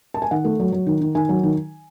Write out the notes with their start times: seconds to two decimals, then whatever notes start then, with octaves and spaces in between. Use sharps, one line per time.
0.14 A5
0.22 G#5
0.31 D#3 F#5
0.45 A3
0.60 F#3
0.72 F#3
0.87 D#3
1.01 D#3
1.15 D#3 G#5
1.29 F#3
1.43 D#3